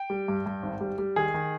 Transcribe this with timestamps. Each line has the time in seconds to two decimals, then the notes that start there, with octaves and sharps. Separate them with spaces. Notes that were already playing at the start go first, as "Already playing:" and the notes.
Already playing: G5
0.10 G3
0.28 G2
0.46 G2
0.63 G#1
0.81 G3
0.98 G3
1.16 D#3 G#4
1.34 D#3